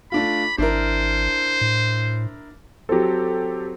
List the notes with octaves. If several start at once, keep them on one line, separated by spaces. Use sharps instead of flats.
A3 D4 F4 B5
G#1 D4 E4 A#4 C5
A2
F#3 C4 G4 A4